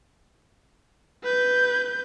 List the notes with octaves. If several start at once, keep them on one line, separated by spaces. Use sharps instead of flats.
B4 G6